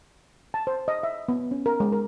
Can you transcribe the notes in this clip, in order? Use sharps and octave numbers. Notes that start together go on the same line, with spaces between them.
A5
C5
D#5
E5
B3
C#4
A#4
G#3
A#4